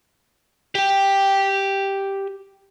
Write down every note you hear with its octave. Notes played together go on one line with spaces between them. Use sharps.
G4 G5